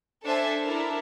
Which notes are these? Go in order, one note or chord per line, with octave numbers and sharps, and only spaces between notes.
D4 A4 C5 E5 G#5
D4 E4 A4 A#4